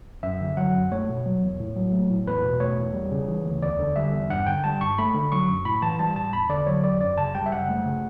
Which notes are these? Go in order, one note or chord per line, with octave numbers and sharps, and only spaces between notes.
F#2 E5
D3
F#3 F#5
F#2
A3 C#5
B2
F#3
E2
A2
F#3
A3
A2
E2 B4
B2
A3 C#5
E2
G3
C#3
E3
D2
E2 D5
D3
G3 E5
E2
G2 F#5
D3 G5
G3 A5
G2 C#6
A3 B5
D3
F#3 C#6
F#2
A2 B5
E3 A5
G3 A5
A2 A5
E2 B5
D3 D5
F#3 C#5
E2 D5
F#2 D5
C#3 A5
G3 G5
E5
F#2 F#5
A3
C#3